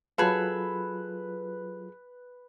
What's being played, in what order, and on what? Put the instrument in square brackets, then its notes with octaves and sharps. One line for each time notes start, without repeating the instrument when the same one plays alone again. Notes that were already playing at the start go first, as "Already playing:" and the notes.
[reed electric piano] F#3 F4 [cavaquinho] G#4 A4 [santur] B4